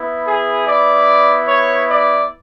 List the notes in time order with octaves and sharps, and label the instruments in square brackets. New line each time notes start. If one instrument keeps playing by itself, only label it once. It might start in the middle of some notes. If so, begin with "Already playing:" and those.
Already playing: [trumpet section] B3 E4
G#4
D5
C#5
D5